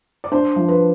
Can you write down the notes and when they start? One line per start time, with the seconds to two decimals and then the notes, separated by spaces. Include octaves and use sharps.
0.24 D5
0.32 D4 C5
0.56 F3
0.68 B4